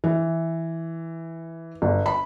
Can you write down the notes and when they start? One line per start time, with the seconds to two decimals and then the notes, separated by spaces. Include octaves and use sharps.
0.04 E3
1.82 G1
2.06 B5